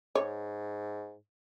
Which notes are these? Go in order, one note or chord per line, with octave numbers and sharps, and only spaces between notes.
G#2 C#5